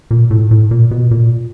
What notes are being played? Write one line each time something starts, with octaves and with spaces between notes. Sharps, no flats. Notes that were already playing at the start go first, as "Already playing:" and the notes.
A#2
A2
A2
A#2
B2
A#2